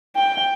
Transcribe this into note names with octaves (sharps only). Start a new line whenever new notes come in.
G5